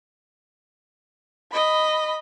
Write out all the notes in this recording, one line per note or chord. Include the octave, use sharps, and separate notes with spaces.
D#5 B5